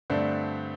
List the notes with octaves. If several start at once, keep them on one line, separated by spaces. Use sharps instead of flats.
G2 D3 A3 C4